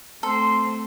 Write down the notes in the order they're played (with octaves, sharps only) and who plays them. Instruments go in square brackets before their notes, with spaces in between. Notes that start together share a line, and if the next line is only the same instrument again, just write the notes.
[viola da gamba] A3 C4 [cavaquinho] A4 [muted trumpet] C6